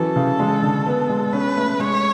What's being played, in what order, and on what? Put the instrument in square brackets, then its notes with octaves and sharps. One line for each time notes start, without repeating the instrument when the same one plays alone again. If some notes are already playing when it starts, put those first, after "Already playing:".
Already playing: [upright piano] E3 F#3 C#4 [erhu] A4
[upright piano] C#3
G#3
D3
B3
G#3
[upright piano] C#4 [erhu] B4
[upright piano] A3
[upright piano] G#3 [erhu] C#5